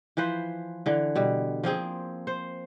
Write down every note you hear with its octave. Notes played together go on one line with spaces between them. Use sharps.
E3 F3 B4 C5
D3 E3
B2 G3
F3 A#3 C4 G#4
C5